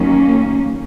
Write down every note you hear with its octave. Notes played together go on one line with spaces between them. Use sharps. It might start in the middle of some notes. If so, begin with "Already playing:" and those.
Already playing: D#2 D#3 F#3 A#3 C#4